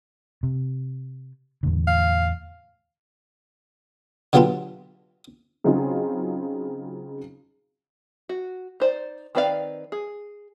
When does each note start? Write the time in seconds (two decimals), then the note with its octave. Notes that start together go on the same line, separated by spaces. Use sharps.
0.43 C3
1.63 E2 A2 D3
1.87 F5
4.33 D3 F#3 B3 F4 G4 A4
5.64 C#3 F#3 C4 D#4 F4 G#4
8.29 F#4
8.80 D#4 C5 D5
9.35 D#3 C4 B4 D5 F5
9.92 G#4